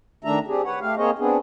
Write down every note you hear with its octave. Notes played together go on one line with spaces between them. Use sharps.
D#3 A3 D4 E5 A#5
C4 D4 G4 G#4
B4 C#5 F#5
A3 G4 F5
A#3 C4 G#4 C5 C#5 D#5
B3 C4 D4 G#4